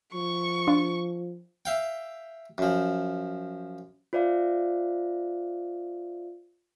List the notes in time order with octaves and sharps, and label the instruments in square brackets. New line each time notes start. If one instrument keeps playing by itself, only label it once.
[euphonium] F3 [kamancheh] C#6
[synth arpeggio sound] D4 F4
[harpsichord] E5 F5 G5
F#2 F3
[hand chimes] F4 C5 D5 E5 F5